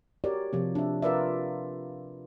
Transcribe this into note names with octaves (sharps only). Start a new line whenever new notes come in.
F#4 G4 A#4 C#5 D5
C3 F3 C4
D4 E5
F4 A#4 B4 D5 E5